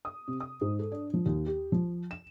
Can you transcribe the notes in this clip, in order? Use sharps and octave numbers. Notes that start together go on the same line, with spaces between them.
D#6
C3
D#6
G#2
A4
D4
F3
D#2
G4
F3
E7